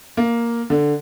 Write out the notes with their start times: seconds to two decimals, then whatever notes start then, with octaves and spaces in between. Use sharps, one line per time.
0.17 A#3
0.70 D3